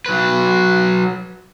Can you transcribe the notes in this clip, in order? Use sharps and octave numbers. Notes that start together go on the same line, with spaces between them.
F#3 B4